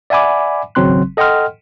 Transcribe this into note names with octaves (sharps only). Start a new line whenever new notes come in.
D5 E5 F#5 G#5 B5 D6
G#1 C#3 F#3 C4 C6 F#6
A4 D#5 F#5 G5 C6 F6